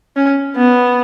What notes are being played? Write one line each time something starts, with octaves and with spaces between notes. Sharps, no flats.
C#4
B3